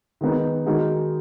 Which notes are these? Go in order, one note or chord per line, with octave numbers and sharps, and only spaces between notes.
D#3 G#3 B3 D#4
D#3 G#3 D#4 F#4 A#4